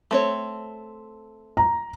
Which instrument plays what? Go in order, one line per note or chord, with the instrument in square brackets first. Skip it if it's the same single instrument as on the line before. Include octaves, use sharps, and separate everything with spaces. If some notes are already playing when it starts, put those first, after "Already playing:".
[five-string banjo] A3 C4 C#5
[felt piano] A#5